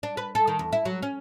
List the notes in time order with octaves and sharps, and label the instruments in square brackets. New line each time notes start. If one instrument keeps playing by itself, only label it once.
[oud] D4
B4
A4
D#3
E2
E4
F#3
C#4